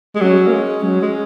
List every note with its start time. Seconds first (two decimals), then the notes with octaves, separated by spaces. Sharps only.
0.15 G#3
0.21 F#3 C#4
0.47 A#3
0.52 G#3
0.83 F#3 C#4
1.02 G#3